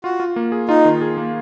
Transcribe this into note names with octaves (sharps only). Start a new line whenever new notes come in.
F4 F#4
F4
A#3
G#4
D#4 F4
D#3
G#4
A#3